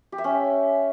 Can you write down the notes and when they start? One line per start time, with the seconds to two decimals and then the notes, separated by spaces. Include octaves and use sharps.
0.12 G4
0.18 E5
0.24 C#4